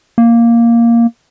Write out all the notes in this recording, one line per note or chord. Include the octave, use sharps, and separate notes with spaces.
A#3